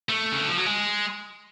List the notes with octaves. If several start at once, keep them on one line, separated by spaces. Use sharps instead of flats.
A3
C#3
D3
F3
F#3
G#3